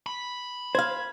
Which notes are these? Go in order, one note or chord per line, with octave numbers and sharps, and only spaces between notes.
B5
C5 F5 G#6